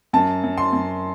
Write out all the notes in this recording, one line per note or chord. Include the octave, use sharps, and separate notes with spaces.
F#2 A5
F#2
C6
F#2